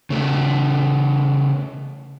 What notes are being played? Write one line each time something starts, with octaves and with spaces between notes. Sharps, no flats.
C#3 A3